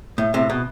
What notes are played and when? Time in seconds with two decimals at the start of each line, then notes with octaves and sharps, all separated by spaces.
0.18 A2
0.34 A2 C3
0.50 B2